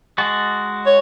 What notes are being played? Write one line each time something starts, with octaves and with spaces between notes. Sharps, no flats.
G#3 F#4 A5
C#5